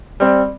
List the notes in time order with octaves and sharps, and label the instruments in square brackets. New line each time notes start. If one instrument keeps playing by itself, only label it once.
[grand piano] G3 C4